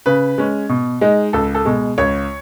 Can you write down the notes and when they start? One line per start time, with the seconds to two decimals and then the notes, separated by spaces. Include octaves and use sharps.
0.06 C#3 B4
0.38 G#3 C#4
0.69 B2
1.01 G#3 D#4
1.33 C#2 A4
1.55 A4
1.65 B2 G#3
1.98 C#2 C#5